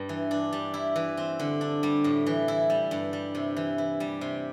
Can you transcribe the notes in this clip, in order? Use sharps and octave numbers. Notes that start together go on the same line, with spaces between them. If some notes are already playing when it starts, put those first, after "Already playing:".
Already playing: G2 G3
E3
D4
G3
E4
E3
C4
D3
D4
G3
A2
E3
E4
G3
G2
G3
C3
E3
E4
G3
C3